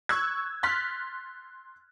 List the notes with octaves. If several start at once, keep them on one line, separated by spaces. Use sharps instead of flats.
C#6 E6 F#6 G#6
C6 F6 F#6 A6 B6